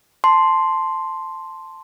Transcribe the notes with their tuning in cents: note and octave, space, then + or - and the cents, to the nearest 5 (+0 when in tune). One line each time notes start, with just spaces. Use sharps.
A5 +0 C6 +0